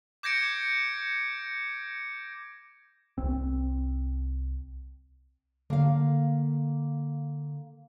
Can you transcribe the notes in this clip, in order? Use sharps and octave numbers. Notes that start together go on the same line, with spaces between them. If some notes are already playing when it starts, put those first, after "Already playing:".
D6 G6 G#6 A#6 C#7 D7
C2 C4
D3 A#3 F5